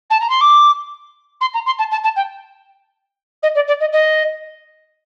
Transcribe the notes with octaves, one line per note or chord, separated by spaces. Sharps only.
A5
A#5
C6
D6
C6
A#5
C6
A5
A5
A5
G5
D#5
D5
D5
D#5
D#5